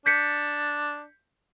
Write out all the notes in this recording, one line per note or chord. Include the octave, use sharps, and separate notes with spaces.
D4 G6 B6 C#7